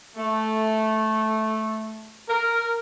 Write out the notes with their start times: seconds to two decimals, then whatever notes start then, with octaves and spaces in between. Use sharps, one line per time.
0.16 A3
2.29 A#4